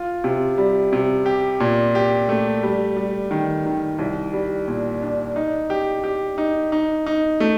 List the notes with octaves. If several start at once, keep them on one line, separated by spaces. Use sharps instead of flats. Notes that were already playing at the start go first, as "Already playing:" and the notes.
Already playing: F4
C3
G3
C3
G4
A#2
G4
A3
G3
G3
D#3
D#3
C2
G3
A#2
D4
D#4
G4
G4
D#4
D#4
D#4
A3